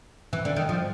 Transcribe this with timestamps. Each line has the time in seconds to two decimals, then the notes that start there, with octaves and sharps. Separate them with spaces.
0.33 E3
0.45 D3
0.56 D#3
0.69 F3